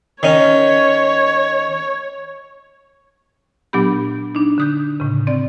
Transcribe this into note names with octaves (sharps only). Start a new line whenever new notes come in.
D#3 C#4 C#5
A#2 F#3 B3 D4 G4 B5
D4 D#4
D3 D#6 G6
A2 C#3
C4 D5